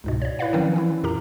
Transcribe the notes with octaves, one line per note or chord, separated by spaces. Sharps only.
C#2 G#2 B2
C#5 D5
E4 B4 C#5 D5 F5 F#5
D#3 F3 F#3 C4 C#4 B4
E3 C4 E4
F2 A#2 G4 A#4 A#5